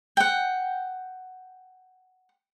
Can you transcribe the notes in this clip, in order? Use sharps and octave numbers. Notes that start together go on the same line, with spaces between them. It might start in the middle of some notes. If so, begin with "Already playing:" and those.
F#5 G5